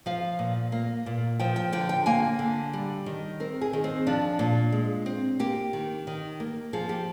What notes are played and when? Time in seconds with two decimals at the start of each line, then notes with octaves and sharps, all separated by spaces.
0.06 F3 F5
0.39 A#2
0.72 A#3
1.06 A#2
1.39 F3 G5
1.56 G5
1.72 D3 G5
1.89 G5
2.06 A#3 G#5
2.39 D3
2.73 G3
3.06 D#3
3.40 C4 A#4
3.61 G#4
3.73 D#3
3.84 C4
4.07 F3 D4
4.39 A#2
4.72 G#3
5.06 C4
5.39 A#3 G4
5.73 D#3
6.07 D#3
6.40 A#3
6.73 F3 G#4
6.89 G4